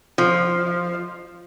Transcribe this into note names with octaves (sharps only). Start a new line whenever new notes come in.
F3